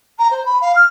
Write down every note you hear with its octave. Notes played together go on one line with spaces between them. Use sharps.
A#5
C5
B5
F5
F6